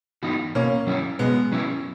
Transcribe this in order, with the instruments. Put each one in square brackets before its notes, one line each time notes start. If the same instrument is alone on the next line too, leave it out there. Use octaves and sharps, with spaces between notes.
[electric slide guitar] E3 B3 D#4 F#4
[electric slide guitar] B2 [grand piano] A#3 C#4
[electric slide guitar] F#3 C#4 E4
[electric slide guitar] B2 [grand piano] G#3 B3
[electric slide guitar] F#3 C#4 E4